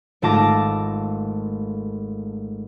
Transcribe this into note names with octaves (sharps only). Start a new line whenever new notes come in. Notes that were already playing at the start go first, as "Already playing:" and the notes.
G#1 A3 F4 A5 D6 A#6